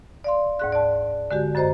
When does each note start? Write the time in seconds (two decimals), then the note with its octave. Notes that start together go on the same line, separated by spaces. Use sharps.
0.24 D5 F5 C6
0.59 D2 G#2 F#6
0.72 D5 A5
1.31 D3 G#3 F#4 G4
1.55 F#2 F#4 C5 D#5 A#5